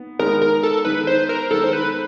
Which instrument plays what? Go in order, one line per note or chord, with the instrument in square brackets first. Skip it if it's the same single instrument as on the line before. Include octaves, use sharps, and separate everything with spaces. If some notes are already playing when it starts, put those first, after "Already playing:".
Already playing: [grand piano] B3 D#4
[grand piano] D#3 G#3 B3 D#4 [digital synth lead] A#4
[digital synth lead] A#4
A4
[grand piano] D#3 G#3 B3 D#4 [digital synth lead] B4
[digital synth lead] C5
A#4
[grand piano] D#3 G#3 B3 D#4 [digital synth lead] A4
[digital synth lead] C5
B4